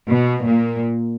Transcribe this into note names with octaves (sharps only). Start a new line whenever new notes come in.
B2
A#2